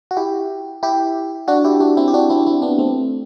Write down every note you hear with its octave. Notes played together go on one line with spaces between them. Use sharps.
F#4
E4 G4
E4 G4
D4 F#4
E4 G4
D4 F#4
C4 E4
G4
D4 F#4
C4 E4
C4 E4
B3 D4
A3 C4